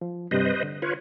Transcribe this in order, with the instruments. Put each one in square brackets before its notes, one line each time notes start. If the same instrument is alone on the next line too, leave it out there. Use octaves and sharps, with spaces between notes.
[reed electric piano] F3
[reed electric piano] G2 C3 G3 [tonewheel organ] B4 C5 D#5
[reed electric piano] D3
[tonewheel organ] F4 B4 C#5